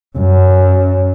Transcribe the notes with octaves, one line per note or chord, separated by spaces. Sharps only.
F#2